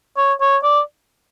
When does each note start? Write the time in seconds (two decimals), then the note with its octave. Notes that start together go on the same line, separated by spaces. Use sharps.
0.17 C#5
0.41 C#5
0.63 D5